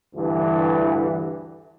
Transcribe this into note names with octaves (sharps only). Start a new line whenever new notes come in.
D2 G2 E3